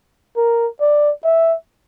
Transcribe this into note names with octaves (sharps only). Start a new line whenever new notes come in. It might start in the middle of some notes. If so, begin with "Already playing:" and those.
A#4
D5
E5